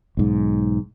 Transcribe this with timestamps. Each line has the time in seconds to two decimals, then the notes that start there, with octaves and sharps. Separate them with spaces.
0.17 B1 G#2